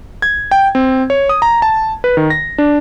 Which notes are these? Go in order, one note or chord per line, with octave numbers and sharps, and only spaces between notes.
G#6
G5
C4
C#5
D#6
A#5
A5
B4
D#3
A#6
D4